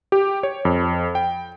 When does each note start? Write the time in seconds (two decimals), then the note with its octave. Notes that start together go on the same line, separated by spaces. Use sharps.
0.12 G4
0.43 C#5
0.65 F2
1.15 G5